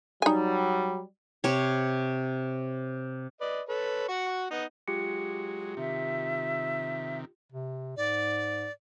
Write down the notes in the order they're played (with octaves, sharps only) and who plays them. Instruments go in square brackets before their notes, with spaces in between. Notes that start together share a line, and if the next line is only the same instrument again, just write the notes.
[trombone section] F#3 G3 [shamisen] D#4 G#5
[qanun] C3 C#5
[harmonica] B4 D5 D#5
A4 B4 C#5
F#4 F#5 C#6
B3 D#4
[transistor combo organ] F#3 G#3 [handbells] F4 G4 C#7
[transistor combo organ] C3 D#3 [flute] E5
[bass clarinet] C3
[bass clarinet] G#2 [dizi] D5